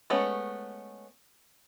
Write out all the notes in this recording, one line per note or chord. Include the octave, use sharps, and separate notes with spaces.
G#3 A3 B3 C#4